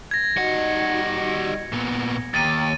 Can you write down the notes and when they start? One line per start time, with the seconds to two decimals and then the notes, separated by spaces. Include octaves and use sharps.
0.11 G#6 A#6
0.37 G3 D#4 F#4 D#5 F#5 C#7
1.72 A#2 B3
2.34 D#2 C#5 G5 A#5 A6 D#7